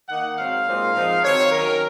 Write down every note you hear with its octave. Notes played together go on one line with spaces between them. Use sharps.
D#3 A#3 D#4 F#5
G#2 F#3 C4 F5
A#2 G#3 C4 D#4
G#2 F3 C4 D#4
D#3 F#3 C4 C#5
D#3 F#3 C#4 A#4